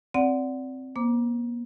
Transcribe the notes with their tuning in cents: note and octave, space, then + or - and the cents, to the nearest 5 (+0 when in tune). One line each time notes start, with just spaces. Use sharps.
C4 +0 D5 -20 F#5 +0
A#3 +40 C5 +0 D6 +0